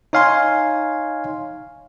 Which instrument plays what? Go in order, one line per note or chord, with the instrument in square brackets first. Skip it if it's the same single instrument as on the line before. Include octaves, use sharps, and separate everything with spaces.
[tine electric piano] D#4 C#5 F5 G#5 C6